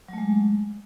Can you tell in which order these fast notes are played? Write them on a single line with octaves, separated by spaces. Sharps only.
F#3 A3 G#3